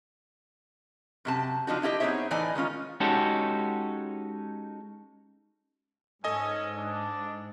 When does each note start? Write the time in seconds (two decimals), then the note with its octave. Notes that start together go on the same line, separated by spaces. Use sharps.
1.25 F#2 C3 A5
1.67 F3 C4 D4 D#4 F#4
1.82 D4 E4 F4 G4 D#5
2.00 B3 C4 D#4 G#4 C#5 E5
2.31 A2 E3 D#4 D5 G#5
2.55 D#3 G#3 C#4 F4
3.00 G#3 C#4 D#4 F#4 G4 A4
6.24 G#2 C#4 A4 D#5 G#5
6.77 D4